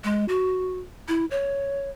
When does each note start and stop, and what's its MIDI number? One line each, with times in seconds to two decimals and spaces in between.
0.04 0.25 56
0.28 0.79 66
1.08 1.25 64
1.31 1.90 73